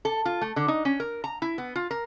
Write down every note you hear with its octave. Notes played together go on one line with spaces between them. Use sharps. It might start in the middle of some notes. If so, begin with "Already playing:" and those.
A4
F4
A3
D3
D#4
C#4
A#4
A#5
E4
B3
F4
A#4